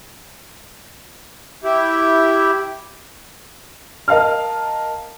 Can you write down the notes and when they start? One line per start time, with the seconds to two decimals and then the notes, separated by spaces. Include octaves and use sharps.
1.64 E4 G4
4.08 A#4 D#5 F5 A5 F6